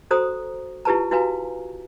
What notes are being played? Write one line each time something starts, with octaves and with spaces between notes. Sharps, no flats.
F#4 A4 C5 A#5 D#6
E4 F4 G4 B4 A5 A#5
E4 F#4 B4 F5 G#5 A#5